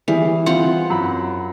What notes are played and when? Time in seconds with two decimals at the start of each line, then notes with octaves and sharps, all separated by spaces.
0.08 E3 G3 G#4
0.46 C4 F4 F#5
0.90 F#2 B5